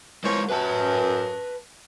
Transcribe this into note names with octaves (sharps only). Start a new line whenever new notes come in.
E3 F3 G#3 A#4 C#5
F#2 B4 A5